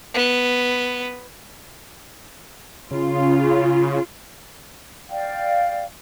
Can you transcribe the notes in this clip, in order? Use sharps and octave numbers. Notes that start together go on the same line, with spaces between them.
B3
C#3 F4
D5 F5 G5